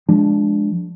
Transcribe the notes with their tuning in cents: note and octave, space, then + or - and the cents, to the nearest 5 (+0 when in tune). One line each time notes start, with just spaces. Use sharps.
F3 -5 G#3 +0 D4 +0